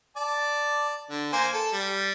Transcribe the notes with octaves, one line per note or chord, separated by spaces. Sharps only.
D5 A5
D3
A#3 C5 G#5
A4
G3